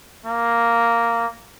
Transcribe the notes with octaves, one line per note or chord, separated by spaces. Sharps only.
A#3